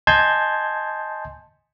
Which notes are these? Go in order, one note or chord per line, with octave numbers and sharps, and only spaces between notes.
D#5 G#5 A5 C6 G6 G#6